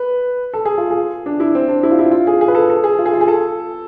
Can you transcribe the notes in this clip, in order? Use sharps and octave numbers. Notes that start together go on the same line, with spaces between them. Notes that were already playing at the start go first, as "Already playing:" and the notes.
Already playing: B4
A4
G#4
F4
G#4
D4
E4
C4
D4
E4
F4
E4
F4
G#4
G#4
B4
A4
A4
G#4
F4
G#4
F4
G#4
A4